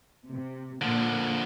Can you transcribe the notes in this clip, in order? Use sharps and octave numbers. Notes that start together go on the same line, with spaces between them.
C3
A#2 D3 F3